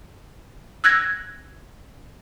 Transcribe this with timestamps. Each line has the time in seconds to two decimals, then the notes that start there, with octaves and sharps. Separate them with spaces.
0.84 E6 F#6 G#6 A#6